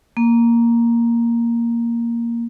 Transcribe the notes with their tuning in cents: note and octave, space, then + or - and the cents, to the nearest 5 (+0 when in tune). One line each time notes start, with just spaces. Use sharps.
A#3 +0